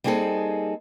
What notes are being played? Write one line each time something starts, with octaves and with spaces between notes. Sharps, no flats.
G3 A#3 C4 D#4 G#4 A4